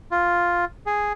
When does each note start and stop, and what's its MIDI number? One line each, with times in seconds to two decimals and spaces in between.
0.11 0.65 65
0.86 1.13 68